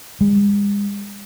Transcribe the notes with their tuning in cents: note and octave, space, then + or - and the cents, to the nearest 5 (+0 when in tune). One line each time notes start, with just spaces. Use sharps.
G#3 -40